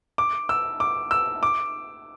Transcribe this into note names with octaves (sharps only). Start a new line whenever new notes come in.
D6
E6
D6
E6
D6